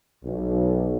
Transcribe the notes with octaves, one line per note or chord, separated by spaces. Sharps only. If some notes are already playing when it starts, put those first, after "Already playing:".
B1